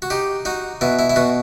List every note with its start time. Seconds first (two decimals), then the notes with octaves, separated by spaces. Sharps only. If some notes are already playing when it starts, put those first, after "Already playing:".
0.02 F#4
0.10 D#4 G4
0.45 D#4 F#4
0.81 B2 E4
0.99 E4
1.10 E4
1.16 B2 F#4